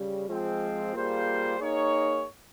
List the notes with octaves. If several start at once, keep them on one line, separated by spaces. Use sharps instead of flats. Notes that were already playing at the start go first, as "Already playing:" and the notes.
Already playing: C#3 G3
F3 G#3 C4
G3 A#3 F4 G#4 C5
A#3 D#4 G#4 C#5